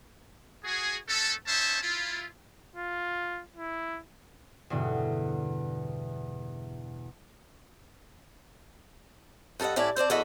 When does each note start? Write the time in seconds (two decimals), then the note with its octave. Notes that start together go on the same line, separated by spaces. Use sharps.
0.64 F#4 G#4
1.08 A3 C#4 A4
1.47 C#4 D#4 C5 E5 A5
1.81 E4 F4
2.76 F4
3.56 E4
4.70 E2 G2 B2 D3
9.60 G2 A4 A#4 D#5 F#5
9.76 A2 C#4 E4 D5 A5
9.96 C4 C5 D5 A5
10.10 E2 C#4 F#4 A4 D#5 E5